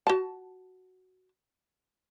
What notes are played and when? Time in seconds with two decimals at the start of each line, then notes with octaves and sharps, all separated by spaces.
0.07 F#4 A5